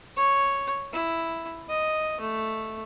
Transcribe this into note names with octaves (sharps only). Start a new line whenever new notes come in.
C#5
E4
D#5
A3